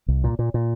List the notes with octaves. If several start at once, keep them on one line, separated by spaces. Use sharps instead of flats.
C2
A#2
A#2
A#2